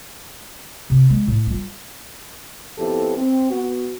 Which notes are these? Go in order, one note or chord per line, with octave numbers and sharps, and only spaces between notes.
C3
G#3
A2
G3 F4
F2 B3 E4 G4 A4 C5
C4
B3 F#4